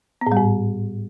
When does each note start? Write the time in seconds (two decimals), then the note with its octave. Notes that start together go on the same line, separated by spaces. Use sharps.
0.21 B3
0.27 A2
0.32 G3
0.37 G#2